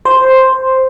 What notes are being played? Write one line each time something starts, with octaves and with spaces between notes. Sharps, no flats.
C5